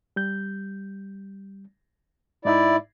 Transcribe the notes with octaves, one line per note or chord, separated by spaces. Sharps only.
G3 G6
G#2 D#4 E4 D5 E5